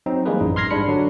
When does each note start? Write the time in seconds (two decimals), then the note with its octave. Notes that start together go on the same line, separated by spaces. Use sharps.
0.06 F#3 C4 D#4
0.26 E3 G3 G#3 A#3 G#4 B4
0.41 A1 F#2 D#4
0.56 C6 F6 G#6 A#6 C7
0.71 G#2 G3 G#3 D4 B5 C#7
0.87 D3 F#3 D4